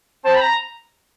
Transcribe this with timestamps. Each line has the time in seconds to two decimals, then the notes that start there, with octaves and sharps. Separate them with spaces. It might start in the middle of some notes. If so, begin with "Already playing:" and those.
0.24 C4 C5 A5
0.35 B5
0.41 A#5